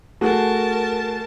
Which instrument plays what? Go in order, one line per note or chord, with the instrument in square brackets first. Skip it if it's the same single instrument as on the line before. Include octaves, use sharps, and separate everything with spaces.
[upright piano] A3 F#4 G#4 [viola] A#4 A5